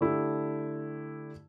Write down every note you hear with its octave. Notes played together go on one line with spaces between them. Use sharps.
D3 A3 E4 G4